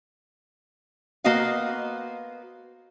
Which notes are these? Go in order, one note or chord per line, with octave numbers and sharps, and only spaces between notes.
A#3 B3 F#4 C5 D#5 F5